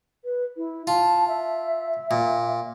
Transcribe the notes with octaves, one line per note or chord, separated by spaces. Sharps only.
B4
E4
F4 A5
E5
A#2